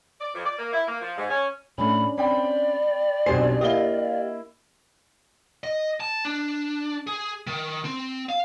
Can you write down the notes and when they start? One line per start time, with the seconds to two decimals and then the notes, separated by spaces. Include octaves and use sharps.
0.20 D5
0.33 F2
0.45 D5
0.58 A#3
0.72 E4
0.86 A#3
1.00 F3
1.16 G#2
1.29 C#4
1.78 A2 A3 C#4 D4 B5
2.18 C4 C5 D5 G5 B5
3.26 B1 B2 C4 D4 G4 C5 G#5 C7
3.61 A#3 E4 G4 D#5 F5 G7
5.64 D#5
6.00 A5
6.25 D4
7.07 G#4
7.47 D#3
7.84 C4
8.29 F5